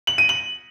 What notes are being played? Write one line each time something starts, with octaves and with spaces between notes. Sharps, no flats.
F#7
D#7
F#7